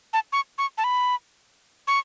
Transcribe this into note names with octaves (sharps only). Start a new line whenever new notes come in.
A5
C#6
C#6
A5
B5
C#6